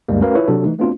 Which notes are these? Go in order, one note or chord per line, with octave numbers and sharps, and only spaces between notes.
D2 G2 G3 G#3 A#3
A3 C#4 F#4 A#4 B4 F5
E4 F4 B4 C#5
C3 F#3 D4 F#4 A4
E3 A3 D#4
A3 B3 C4 D4 F4 F#4